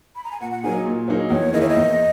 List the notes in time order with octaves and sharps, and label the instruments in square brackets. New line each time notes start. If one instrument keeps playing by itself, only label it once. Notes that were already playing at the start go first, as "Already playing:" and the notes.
[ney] B5
A#5
G#5
[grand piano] A#2 [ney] F#5
[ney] F#5
[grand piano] F#3 A#3 D#4 G#4 [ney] G#5
[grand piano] A#2
F#3 A#3 D#4 G#4
[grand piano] E2 [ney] C#5
[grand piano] D#3 A#3 E4 G#4 [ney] D#5
[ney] C#5
D#5
[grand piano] E2